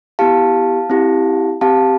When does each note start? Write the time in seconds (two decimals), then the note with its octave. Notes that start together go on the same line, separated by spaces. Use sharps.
0.19 B3 E4 G4 F5 A5
0.90 C4 E4 G4
1.61 C4 G4 F5 A5